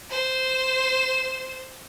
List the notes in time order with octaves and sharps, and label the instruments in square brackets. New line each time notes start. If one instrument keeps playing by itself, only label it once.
[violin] C5 E7